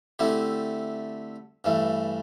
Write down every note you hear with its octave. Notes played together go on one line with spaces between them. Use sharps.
D3 A3 C4 E4 G4
G2 E3 A3